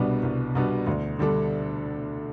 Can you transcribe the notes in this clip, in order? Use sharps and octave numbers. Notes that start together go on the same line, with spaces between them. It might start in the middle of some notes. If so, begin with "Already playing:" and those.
Already playing: C2 B2 G3 B3 D4
C2
B2 G3 B3 D4
D2
D3 G3 D4 A4